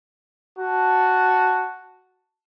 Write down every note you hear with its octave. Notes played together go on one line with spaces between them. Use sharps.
F#4 A5